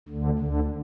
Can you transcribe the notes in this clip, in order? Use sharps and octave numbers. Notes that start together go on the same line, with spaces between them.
D2 D3
D2 D3